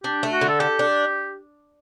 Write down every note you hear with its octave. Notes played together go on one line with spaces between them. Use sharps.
D4 G4
A3
F#4
D3
A4
G4 A4
D4